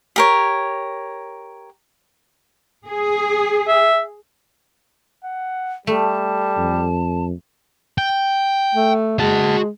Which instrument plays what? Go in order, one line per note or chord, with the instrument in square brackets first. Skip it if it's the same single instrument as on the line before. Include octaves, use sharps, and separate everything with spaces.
[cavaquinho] G4 A#4 C#5
[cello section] G#4
[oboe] E5
[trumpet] F#5
[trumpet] G3 [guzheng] A3 [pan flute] A5
[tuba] F2
[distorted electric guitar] G5
[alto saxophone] A3
[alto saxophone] G#3 [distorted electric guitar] F#4 A5